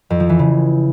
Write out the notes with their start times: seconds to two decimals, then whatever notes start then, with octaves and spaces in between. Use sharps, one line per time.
0.10 F2
0.20 F3
0.29 E3
0.39 C#3